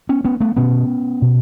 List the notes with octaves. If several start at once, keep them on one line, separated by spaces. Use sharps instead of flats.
B3 C#4
B3 C#4
A3 B3
B2 B3 C#4
B2